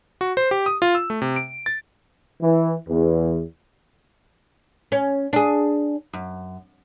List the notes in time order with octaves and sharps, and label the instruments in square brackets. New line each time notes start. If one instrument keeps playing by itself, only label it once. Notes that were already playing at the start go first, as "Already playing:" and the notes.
[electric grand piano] F#4
C5
G4
D#6
F4
E6
A3
C3
D7
A6
[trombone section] E3
E2
[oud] C#4
D4 G#4
F#2